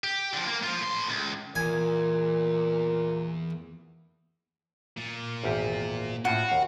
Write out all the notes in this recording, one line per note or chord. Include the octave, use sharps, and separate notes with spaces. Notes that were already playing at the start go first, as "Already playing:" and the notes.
G4
D3 F3
A#3
F3 F4
A2 C6
C#2
E2 A#2 G#5
A#2
G#1 E2 G4
A2 F4 F#4 F#5 G5
D#2 F5